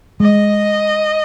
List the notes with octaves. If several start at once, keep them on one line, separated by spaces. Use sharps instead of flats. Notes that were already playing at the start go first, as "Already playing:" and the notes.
G#3 D#5